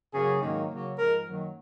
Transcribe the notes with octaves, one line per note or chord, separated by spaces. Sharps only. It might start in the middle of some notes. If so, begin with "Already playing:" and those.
F#2 C#3 F#3 A#3 G#4
G#2 D#3 F#3 A#3
C#3 F#3 A#3
G#2 F3 G#3 A#4
F#2 D#3 F#3 A#3